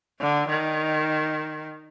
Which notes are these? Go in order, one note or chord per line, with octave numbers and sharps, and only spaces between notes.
D3
D#3